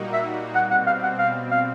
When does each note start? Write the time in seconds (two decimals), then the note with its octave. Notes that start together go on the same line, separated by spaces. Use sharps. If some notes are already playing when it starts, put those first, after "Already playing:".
Already playing: A#2 G3 A#3 D#4 F#4
0.13 E5
0.55 B2 G3 C4 F#5
0.71 F#5
0.87 F5
1.03 F#5
1.19 F5
1.52 F5